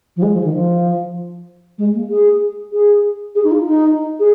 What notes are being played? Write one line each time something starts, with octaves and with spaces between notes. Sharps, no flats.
F3
G#3
F3
D#3
F3
G#3
A#3
G#4
G#4
G#4
D#4
F4
D#4
G#4